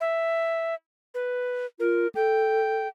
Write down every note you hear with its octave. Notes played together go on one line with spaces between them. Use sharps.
E5
B4
F4 A#4
A4 G5